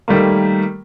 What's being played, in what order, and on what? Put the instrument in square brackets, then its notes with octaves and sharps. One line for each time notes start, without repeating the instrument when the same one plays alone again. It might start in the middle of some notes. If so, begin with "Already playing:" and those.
[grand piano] D#3 G3 A3 A#3